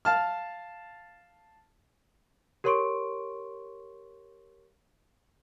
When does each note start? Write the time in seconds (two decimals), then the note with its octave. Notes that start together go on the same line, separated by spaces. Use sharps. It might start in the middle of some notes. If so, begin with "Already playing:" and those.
0.05 F5 A5 F6
2.64 G4 A#4 C#5 C6 C#6 D7